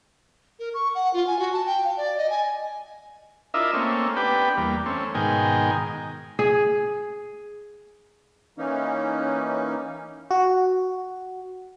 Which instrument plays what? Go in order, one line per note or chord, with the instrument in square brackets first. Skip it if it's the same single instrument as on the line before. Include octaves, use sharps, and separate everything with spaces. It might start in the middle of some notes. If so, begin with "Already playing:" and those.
[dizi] A#4
C#6
F#5
F4
G#5
F#4
A5
G5
F5
D5
D#5
G#5
[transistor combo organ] D4 E4 F4 A#4 D#5 E5
A3 A#3 C4 C#4
B3 D4 G4 B4 G5
E2 G3 A#3
A3 C4 C#4
G#2 B2 D#3 A#4 G5 G#5
[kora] G#4
[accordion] E3 A#3 C#4 D#4
[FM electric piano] F#4